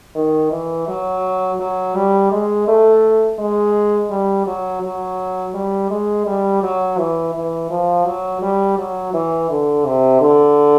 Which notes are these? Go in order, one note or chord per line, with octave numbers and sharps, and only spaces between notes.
D#3
E3
F#3
F#3
G3
G#3
A3
G#3
G3
F#3
F#3
G3
G#3
G3
F#3
E3
E3
F3
F#3
G3
F#3
E3
D3
C3
D3